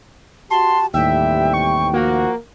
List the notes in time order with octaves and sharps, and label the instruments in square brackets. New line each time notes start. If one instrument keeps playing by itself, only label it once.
[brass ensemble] F#4 G4 [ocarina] A5 [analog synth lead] C6
[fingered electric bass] D#2 A2 [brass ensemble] C3 E3 G3 [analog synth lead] E5 [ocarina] G5
[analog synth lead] C#6
[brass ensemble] F3 F#4 [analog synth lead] A#3